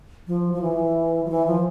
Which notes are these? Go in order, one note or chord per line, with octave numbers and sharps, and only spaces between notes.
F3
F3
E3
F3
E3
F3